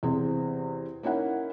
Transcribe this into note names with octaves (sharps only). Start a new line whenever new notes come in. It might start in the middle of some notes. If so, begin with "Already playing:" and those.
E2 C3 C4 G#4
A#3 C#4 D#4 E4 F#5